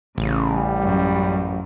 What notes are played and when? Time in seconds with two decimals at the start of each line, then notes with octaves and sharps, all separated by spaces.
0.18 A1 C#3
0.50 G3
0.81 F#2